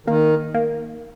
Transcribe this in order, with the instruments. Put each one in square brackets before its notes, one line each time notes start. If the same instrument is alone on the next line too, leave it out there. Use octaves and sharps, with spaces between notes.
[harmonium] D#3 [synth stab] A#3
[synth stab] A#3